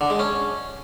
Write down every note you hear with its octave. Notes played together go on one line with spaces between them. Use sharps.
D3
G#3
C#4